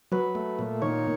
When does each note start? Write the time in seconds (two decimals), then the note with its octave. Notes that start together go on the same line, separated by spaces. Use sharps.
0.12 F#3 B4
0.35 A3
0.59 A#2
0.82 D#3 C#5